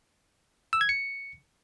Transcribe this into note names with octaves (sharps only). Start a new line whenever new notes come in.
E6
G#6
C#7